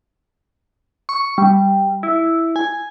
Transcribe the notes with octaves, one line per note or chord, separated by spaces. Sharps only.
C#6
G3
E4
G#5